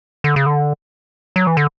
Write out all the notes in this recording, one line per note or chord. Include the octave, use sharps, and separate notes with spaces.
D3
C#3
D3
F#3
E3
D3